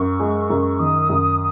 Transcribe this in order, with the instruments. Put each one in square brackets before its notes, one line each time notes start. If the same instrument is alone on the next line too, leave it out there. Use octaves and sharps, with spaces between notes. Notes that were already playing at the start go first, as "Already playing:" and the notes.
Already playing: [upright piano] F#2 [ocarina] C#6
[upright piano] G#3
F#2
[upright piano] D#3 [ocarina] D#6
[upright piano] F#2